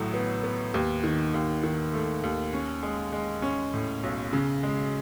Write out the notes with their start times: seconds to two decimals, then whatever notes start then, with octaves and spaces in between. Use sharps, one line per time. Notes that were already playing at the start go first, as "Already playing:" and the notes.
Already playing: A1 A2 F#3
0.14 B3
0.44 B3
0.74 D#2
1.04 D#3
1.34 D#2
1.63 D#3
1.93 A3
2.24 D#2
2.53 C#4
2.83 G#3
3.12 G#3
3.42 C#4
3.73 A2
4.03 B1
4.33 C#3
4.63 G#3